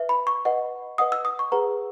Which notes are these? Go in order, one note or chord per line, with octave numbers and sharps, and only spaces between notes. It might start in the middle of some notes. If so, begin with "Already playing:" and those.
Already playing: B4 E5
B5
C#6
B4 D#5 F#5
B4 D#5 F#5 D#6
E6
D#6
C#6
G#4 B4 F#5 A#5